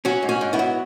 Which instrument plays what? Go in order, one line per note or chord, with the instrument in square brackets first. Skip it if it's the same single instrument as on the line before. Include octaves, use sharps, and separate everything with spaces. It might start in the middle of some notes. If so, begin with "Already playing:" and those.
[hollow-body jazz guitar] F#3 C#4 F#4
G#2
C#4 F#4
G#2
B3 E4
F#3